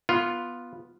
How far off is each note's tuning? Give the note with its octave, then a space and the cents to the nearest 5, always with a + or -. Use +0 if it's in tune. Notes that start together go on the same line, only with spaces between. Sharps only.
B3 -5 F4 +0